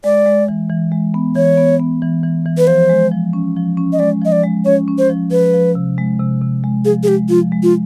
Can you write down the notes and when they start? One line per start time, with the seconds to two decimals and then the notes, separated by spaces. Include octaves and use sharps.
0.04 G#3 D5
0.26 G#3
0.48 E3
0.70 E3
0.92 G#3
1.14 B3
1.36 E3 C#5
1.57 B3
1.80 B3
2.02 E3
2.24 E3
2.46 E3
2.58 B4
2.67 F3 C5
2.90 G#3
3.12 F3
3.33 C#4
3.56 F3
3.77 C#4
3.93 D#5
3.99 G#3 D5
4.22 F3 D#5
4.32 D5
4.44 G#3
4.65 C#4 C#5
4.88 C#4
4.98 C5
5.10 F3
5.31 F3 B4
5.54 F3
5.75 C3
5.98 G#3
6.19 C3
6.42 C3
6.64 G#3
6.85 F3 G#4
7.03 G#4
7.07 G#3 G4
7.29 F3 F4
7.52 G#3
7.63 F4